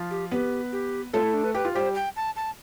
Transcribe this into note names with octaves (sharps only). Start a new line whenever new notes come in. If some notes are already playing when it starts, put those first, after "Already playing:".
Already playing: F3 F4
G4
B3 G4 B4
G4
A3 F4 A4
E4
D4
B4
G4 B4
F4
G3 G4 C5
G5
A5
A5